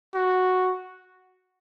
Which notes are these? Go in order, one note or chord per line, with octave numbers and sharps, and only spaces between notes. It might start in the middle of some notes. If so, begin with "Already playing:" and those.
F#4